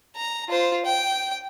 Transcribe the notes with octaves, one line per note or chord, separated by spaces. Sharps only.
A#5
F4 C5
G5